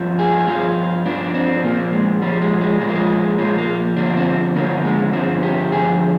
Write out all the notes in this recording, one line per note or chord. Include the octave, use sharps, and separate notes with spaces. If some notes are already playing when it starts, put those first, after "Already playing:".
Already playing: G2 F3
G#4
G2 F3 F4
G2 F3 D4
C4
A#2 F3 A#3
G#3
A#2 F3 G3
G#3
G#3
A#2 F3 G#3
A#3
G#3
A#2 F3 G#3
A#3
G2 D3 F3 D4
C4
G2 D3 F3 A#3
G#3
G2 D3 F3 C4
G4
G2 D3 F3 G#4